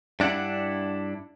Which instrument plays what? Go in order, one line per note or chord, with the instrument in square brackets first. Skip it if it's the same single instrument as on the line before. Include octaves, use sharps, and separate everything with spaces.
[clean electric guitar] G2 D4 E4 F#5